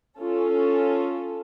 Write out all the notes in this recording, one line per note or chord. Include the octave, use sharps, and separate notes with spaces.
C#4 F4 A4